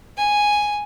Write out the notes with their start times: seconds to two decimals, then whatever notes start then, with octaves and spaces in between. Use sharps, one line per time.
0.18 G#5